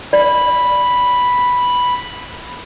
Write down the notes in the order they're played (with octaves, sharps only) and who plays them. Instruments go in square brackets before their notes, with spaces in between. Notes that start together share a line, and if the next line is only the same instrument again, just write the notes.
[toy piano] D5 [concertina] B5